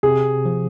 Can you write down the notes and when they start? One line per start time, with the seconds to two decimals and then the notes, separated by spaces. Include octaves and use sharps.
0.03 C3 G#4
0.45 F3